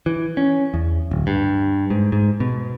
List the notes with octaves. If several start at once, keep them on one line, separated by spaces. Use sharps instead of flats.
E3
C#4
E2
D1
G2
G#2
G#2
B2